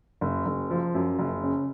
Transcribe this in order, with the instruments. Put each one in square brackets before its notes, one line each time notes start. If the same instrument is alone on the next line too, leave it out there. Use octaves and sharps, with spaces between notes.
[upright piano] F#1
F#1
F3
F#2
F#1
C#3